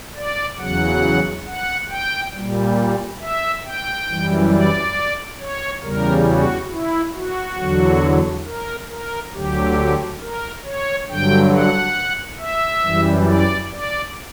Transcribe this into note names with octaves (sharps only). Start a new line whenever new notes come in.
D5
E2 C#3 F#3 F#5
F#5
G5
A#2 G3
E5
G5
F#2 E3 G3
D5
C#5
E2 C#3 G3 A#4
F#4
E4
F#4
E2 D3 F#3
A#4
A#4
D2 D3 F#3 G4
A#4
C#5
G2 D3 F#3 G5
F#5
E5
F#2 E3 G3
D5
D5